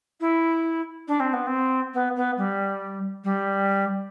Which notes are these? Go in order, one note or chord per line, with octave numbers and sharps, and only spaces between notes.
E4
D4
C4
B3
C4
B3
B3
G3
G3